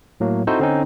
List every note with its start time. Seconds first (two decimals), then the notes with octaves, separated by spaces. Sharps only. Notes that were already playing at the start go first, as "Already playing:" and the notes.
0.20 A2 F#3 A#3
0.47 C4 D#4 E4 F#4 A4 C5
0.60 D3 C4 C#4 D#4